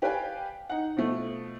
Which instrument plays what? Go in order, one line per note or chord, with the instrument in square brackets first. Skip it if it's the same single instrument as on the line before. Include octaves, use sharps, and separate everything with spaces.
[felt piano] G4 B4 D5 F5 G5 G#5
D#4 F#5
B2 F3 A3